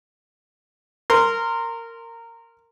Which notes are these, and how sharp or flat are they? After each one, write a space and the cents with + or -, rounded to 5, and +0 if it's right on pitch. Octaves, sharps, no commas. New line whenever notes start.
A#4 -15 C6 +0